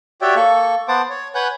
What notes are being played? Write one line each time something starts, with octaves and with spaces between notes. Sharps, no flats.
F#4 G4 C#5 D5 E5 G5
A#3 A4 C#6
B3 C5 F#5 A5 D6
C#5
B4 C#5 F#5 G#5 F#6 G6